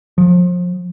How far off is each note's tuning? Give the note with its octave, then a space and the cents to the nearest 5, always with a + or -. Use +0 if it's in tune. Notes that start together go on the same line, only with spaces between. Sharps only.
F3 +30